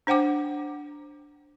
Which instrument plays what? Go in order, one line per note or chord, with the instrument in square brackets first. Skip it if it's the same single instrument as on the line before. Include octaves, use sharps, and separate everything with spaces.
[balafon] D4 C5 F#5 G5 D6